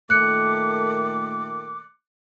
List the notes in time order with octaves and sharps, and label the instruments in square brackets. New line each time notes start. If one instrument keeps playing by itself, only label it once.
[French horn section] A#2 D#3 A3 [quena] D6 [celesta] F#6 C#7